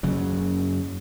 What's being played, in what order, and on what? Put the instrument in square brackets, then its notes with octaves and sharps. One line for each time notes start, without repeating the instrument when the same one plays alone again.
[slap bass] F#1 F#2 C#3 F#3